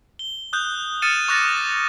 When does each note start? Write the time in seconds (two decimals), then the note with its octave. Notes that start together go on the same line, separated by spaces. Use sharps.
0.19 G7
0.53 D#6 F#6 G6
1.02 D#6 F6 A6 C#7 D#7 E7
1.28 C#6 D6 F#6 A6 A#6